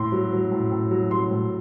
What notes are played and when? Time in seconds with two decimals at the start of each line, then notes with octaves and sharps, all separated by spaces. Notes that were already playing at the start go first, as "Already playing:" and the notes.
Already playing: A2 C6
0.12 F#3
0.32 F#3
0.52 A2
0.72 A2
0.91 F#3
1.11 F#3 C6
1.31 A2